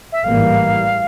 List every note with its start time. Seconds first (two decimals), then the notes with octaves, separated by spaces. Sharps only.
0.12 E5
0.24 A1 G#2 E3 G3 A#3 F5